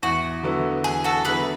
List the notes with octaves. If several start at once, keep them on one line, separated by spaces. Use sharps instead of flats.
E2 F#4
D3 F#3 B3 E4
E2 G#4
F#4 A4
D3 F#3 B3 E4 G#4 B4